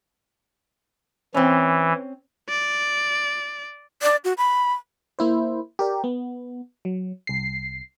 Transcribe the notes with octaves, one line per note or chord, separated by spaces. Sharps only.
E3 C4 C#4
D5
D5
F#4
B5
A#3 E4 C5
G4 A#4 D5
B3
F#3
C2 C7